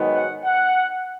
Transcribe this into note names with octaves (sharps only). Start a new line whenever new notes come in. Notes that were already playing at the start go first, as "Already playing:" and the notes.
Already playing: G#2 D#3 F#3 B3
F#5
F#5